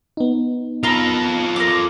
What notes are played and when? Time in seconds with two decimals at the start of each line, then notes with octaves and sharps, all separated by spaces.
0.17 B3 D#4
0.83 F4 A4 A#4 B5
1.56 A#4 D6